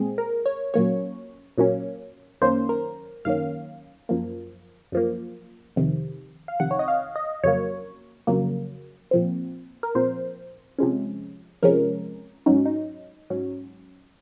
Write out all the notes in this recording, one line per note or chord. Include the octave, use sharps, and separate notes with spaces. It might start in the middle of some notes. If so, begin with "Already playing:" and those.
Already playing: A#2 G#3 C4 G#4
A#4
C#5
A#2 F#3 A#3 C#4 C#5
A#2 F#3 A#3 C#4
F#2 D#3 A#3 C#4 C5
A#4
F#2 D#3 A#3 C#4 F5
F#2 F3 A#3
F#2 F3 A#3
F2 C3 D#3
F5
F2 C3 D#3 F#5
C#5
D#5
F5
D#5
F2 C#3 F#3 A#3 C#5
F2 C#3 F#3 A#3
A#2 F3 C4
A#4
A#2 F3 C4 C5
C3 F3 G#3 C#4
C3 F3 G#3 C#4 A#4
G#2 F#3 C#4 D#4
D#4
G#2 F#3 C#4